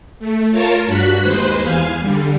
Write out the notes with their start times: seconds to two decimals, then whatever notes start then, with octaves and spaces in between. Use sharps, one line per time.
0.19 A3
0.51 F4 A#4 C#5 A5
0.86 G2 F#4 F#6 B6
1.21 D#2 G#3 B4 C5
1.62 E2 F5 G#5
2.00 D3 G3